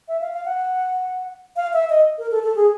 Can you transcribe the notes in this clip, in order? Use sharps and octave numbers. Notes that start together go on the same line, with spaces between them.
E5
F5
F5
F#5
F5
E5
D#5
A#4
A4
A4
G#4